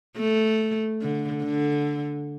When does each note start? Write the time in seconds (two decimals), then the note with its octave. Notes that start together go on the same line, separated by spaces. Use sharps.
0.17 A3
1.01 D3
1.43 D3